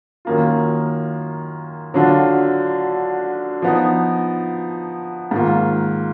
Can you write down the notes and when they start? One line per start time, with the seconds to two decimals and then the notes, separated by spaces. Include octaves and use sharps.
0.25 F#2 D#3 A#3 F4
1.94 D3 F#3 D4 F4
3.62 F3 B3 D#4
5.31 G#2 D#3 A#3 F4